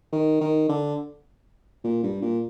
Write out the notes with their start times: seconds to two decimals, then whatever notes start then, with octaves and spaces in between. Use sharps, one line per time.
0.12 D#3
0.41 D#3
0.69 D3
1.84 A#2
2.03 G2
2.22 A#2